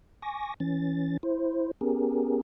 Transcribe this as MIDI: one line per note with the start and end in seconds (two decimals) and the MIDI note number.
0.22 0.54 80
0.22 0.54 85
0.22 0.54 86
0.22 0.54 94
0.60 1.17 52
0.60 1.17 61
0.60 1.17 93
1.23 1.71 64
1.23 1.71 72
1.81 2.41 59
1.81 2.41 61
1.81 2.41 67
1.81 2.41 68
1.81 2.41 70